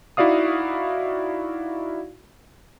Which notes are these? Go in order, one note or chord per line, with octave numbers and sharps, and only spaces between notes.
D#4 E4 F#4 D5 F5 D#6